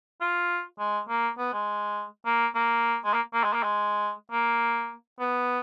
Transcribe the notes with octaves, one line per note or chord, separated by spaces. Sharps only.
F4
G#3
A#3
B3
G#3
A#3
A#3
G#3
A#3
A#3
G#3
A#3
G#3
A#3
B3